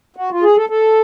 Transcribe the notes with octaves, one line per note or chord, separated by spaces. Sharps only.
F#4
F4
G#4
A4
A4